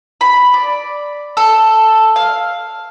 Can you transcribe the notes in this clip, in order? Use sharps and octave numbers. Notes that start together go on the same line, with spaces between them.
B5
D5
A4
F5